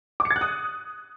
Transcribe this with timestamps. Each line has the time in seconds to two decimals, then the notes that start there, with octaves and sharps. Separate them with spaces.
0.20 D6
0.25 C#7
0.31 A6
0.36 F#6
0.41 D#6